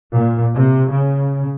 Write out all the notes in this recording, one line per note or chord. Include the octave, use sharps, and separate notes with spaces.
A#2
C3
C#3